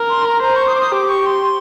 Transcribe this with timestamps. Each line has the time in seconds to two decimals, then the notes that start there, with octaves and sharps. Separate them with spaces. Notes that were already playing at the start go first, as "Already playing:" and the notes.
Already playing: A#4
0.09 C6
0.25 A#5
0.42 C5 A#5
0.55 C#6
0.67 D#6
0.74 D6
0.80 D#6
0.91 G4 D6
1.09 C#6
1.26 C6